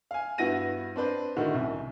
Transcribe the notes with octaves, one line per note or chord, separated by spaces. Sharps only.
F5 G#5
G2 B3 E4 F#4 A#6 D#7
C4 D4 B4 C5
A2 D3 D#3 F#4
C2 F#2